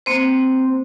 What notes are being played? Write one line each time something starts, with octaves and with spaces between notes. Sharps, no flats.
A#3 C4 C5